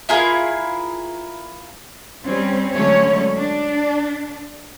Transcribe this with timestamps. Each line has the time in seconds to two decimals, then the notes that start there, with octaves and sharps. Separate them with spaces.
0.09 E4 F4 G#4 A#4
2.24 G3 C4 C#4
2.74 D3 F#3 G#3 A3 C#4 C#5
3.35 D4